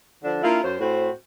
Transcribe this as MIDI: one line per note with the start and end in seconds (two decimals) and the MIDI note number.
0.23 0.41 50
0.23 0.41 53
0.23 0.41 62
0.43 0.60 58
0.43 0.60 62
0.43 0.60 64
0.43 0.60 65
0.62 0.76 42
0.62 0.76 61
0.62 0.76 72
0.79 1.09 45
0.79 1.09 60
0.79 1.09 66
0.79 1.09 72